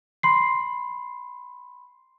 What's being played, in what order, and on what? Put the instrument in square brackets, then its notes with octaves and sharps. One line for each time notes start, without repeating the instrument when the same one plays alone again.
[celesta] B5 C6 C7